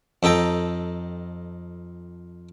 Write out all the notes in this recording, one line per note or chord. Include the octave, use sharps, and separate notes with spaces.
F2 D#4 A4 G5 A#5